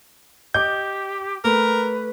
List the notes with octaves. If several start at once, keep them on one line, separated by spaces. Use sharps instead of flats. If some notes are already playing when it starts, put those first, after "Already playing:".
G4 D#5 D6 G6
A3 A#4 B4